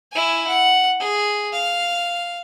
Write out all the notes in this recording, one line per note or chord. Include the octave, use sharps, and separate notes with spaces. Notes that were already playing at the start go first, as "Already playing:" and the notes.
E4 G#5
F#5
G#4
F5